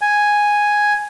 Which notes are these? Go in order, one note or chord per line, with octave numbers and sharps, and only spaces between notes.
G#5